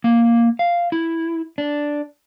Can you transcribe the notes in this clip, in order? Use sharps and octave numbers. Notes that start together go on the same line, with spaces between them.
A#3
F5
E4
D4